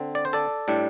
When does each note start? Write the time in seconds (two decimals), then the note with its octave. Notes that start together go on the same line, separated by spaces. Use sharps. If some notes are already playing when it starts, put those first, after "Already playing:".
Already playing: D3 C4
0.15 D5
0.25 C5
0.33 A4 D5
0.68 A2 G3 D4